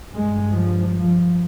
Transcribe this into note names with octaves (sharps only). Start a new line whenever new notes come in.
G2 G#3
F3
F3